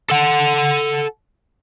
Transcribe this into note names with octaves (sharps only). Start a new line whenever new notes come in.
A4 F#5